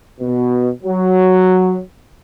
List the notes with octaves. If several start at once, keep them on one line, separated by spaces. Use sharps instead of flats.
B2
F#3